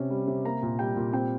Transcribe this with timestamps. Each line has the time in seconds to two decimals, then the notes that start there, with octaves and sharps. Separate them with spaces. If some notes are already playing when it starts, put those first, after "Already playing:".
Already playing: C3 C#4
0.10 G3
0.27 C3
0.45 A#3 A#5
0.62 A#2
0.79 G3 G5
0.96 A#2
1.13 C4 G5